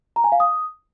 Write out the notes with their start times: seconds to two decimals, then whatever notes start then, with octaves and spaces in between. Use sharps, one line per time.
0.16 A#5
0.24 G#5
0.32 F5
0.40 D#6